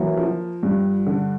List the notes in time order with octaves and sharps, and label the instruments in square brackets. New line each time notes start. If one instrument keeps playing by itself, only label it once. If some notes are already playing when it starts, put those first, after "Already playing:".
Already playing: [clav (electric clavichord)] E3 F#3 [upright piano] A#3
[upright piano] F3
G2
D3